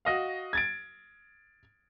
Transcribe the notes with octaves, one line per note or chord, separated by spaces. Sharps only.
F#4 D#5 F5
G#6 A6 D7